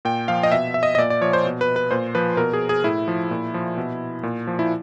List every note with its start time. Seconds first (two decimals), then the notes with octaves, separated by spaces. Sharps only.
0.05 A#2 G5
0.28 F3 F5
0.43 D#5
0.52 B2 E5
0.74 E5
0.83 D#5
0.95 D#5
0.98 A#2 D5
1.10 D5
1.21 F3 C#5
1.33 C5
1.45 B2
1.61 B4
1.76 B4
1.91 A#2 C5
2.15 F3 B4
2.37 B2 A#4
2.53 G#4
2.69 G#4
2.84 A2 E4
3.08 F3
3.31 A#2
3.54 F3
3.77 B2
4.23 A#2
4.47 F3
4.59 E4